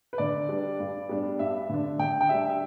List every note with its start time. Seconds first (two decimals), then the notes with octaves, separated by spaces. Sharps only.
0.13 B4
0.18 D3 D5
0.49 G3 D4
0.80 G2
1.09 G3 B3 D4
1.39 G2 E5
1.69 D3 A3 D4
1.99 D3 G5
2.21 G5
2.29 G3 D4 E5
2.49 E5